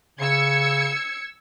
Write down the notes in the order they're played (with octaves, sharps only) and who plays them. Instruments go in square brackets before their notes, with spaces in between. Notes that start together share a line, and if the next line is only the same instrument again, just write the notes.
[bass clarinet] C#3 [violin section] E6 G#6 C#7